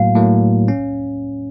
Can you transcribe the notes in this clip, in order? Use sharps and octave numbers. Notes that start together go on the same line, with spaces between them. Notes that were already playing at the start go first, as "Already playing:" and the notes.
Already playing: A2 F#3 A#3 F5
A2 F#3 A#3
C#4